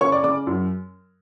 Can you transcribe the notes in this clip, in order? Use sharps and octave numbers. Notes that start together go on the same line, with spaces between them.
C#3 C#5 C#6
D5 D6
C#3 D5 D6
F#2